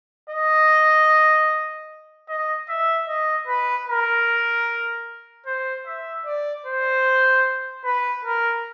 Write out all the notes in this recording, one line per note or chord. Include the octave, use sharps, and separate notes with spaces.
D#5
D#5
E5
D#5
B4
A#4
C5
E5
D5
C5
B4
A#4